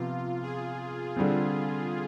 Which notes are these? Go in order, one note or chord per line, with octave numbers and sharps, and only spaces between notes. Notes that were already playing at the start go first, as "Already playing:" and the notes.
Already playing: C3 F3 B3 F4
G#4
D3 G3 C4